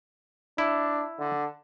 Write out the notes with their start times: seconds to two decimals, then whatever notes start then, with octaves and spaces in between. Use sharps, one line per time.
0.58 D4 E4
1.19 D3